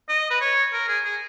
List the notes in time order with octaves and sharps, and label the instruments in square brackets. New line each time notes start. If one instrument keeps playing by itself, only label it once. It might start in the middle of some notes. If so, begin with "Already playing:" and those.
[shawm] D#5
B4
C#5
A#4
G#4
G#4